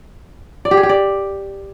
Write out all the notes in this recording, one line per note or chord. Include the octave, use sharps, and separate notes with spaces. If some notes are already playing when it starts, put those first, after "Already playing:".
D5
G4
G#4
G4
D5